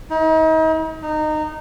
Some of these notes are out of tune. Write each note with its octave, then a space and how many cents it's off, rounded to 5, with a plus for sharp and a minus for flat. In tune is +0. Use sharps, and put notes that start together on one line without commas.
D#4 +40
D#4 -20